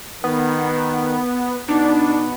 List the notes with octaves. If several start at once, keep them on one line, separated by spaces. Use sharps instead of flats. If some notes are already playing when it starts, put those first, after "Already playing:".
D#3 B3
B2 B3 D4 D#4